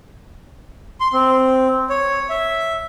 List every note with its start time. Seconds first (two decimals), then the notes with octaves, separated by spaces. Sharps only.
1.00 C6
1.13 C4
1.90 C#5
2.30 E5